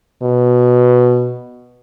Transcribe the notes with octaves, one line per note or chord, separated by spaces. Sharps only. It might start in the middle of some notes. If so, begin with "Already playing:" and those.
B2